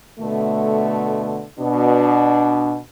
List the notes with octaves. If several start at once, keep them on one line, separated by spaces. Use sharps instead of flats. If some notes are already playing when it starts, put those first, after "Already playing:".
B2 D3 A3
B2 D4